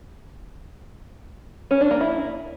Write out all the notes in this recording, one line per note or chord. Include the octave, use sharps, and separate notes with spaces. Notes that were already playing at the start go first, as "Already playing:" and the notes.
C#4
D4
A#3
E4